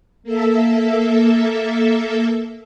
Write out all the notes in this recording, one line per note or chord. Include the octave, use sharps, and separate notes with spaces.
A#3 A4 E5